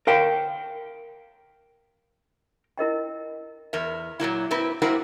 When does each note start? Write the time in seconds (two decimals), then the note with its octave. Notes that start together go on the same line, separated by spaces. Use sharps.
0.07 A#4 F5 G5
2.78 E4 A#4 D#5 G5
3.73 E2 A#4 E5
4.20 A#2 F#3 A#3 E4
4.51 A#3 C4 E4 B4
4.82 G3 A#3 E4 F#4 A#4 C5